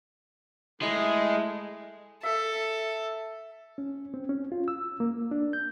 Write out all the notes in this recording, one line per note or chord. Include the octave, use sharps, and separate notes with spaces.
G#3 A3 E4
A4 E5
C#4
C4
C#4
F4
E6
A#3
D4
G6